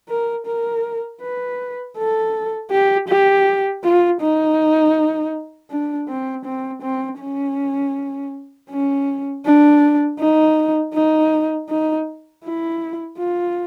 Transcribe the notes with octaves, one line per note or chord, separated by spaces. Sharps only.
A#4
A#4
B4
A4
G4
G4
F4
D#4
D4
C4
C4
C4
C#4
C#4
D4
D#4
D#4
D#4
E4
F4